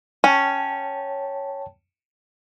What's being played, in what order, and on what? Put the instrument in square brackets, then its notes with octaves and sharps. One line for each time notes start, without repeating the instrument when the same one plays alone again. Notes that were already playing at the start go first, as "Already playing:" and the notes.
[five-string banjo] C#4 [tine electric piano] C#5 G5 A5